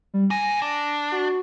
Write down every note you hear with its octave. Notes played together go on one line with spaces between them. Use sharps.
G3
A#2 G#5 A#6
D4
F#4